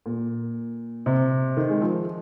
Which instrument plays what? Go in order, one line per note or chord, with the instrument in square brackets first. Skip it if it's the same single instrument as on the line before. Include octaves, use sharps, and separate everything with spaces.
[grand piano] A#2
C3
D#3
G#3
F3